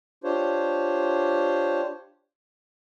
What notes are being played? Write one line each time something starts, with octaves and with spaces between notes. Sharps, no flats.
D4 F4 G4 C5 C#5